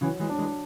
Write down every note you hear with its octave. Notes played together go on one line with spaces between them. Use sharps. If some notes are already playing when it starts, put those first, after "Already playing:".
C#3 E3 F#3
E3 G#3
D4
E3 G#3